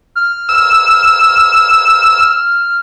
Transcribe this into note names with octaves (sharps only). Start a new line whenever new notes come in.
F6
E6